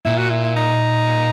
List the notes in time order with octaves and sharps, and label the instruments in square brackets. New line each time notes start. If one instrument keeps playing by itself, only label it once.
[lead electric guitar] A#2 [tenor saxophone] E4
[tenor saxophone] F#4
E4
E4
D#4